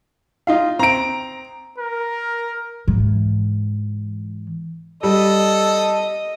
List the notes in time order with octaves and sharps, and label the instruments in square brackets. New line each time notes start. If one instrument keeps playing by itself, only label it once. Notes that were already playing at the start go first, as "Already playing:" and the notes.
[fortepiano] D#4 F4 F5
[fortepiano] C4 [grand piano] A#5 D7
[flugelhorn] A#4
[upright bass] G#2 E3
[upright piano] G3 [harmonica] A4 [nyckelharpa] D#5